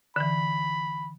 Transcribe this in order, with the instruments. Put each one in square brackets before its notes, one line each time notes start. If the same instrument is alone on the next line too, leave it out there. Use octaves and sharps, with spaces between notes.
[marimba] D3 E3 [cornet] B5